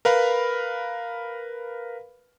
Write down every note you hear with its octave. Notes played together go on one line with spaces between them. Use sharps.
A#4 B4 F5 B5